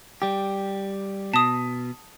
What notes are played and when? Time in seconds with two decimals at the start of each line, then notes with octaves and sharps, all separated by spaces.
0.22 G3 G4
1.34 B2 A5 D#6